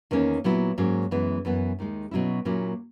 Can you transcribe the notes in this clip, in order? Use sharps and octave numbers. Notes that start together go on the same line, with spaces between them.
E2 D#3 A#3 C#4
A#2 F#3 B3 E4
G#2 F#3 A#3 C#4
F#2 E3 G#3 B3
F#2 E3 B3 E4
D#2 D#3 G#3
B2 F#3 C#4 E4
A#2 F#3 A#3 C#4 E4